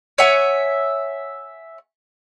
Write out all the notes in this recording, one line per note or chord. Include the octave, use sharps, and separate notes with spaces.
C#5 E5 F#5 G#5